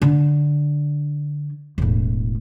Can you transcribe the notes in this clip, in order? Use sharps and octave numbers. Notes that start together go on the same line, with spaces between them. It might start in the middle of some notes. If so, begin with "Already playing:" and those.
D3
E1 A2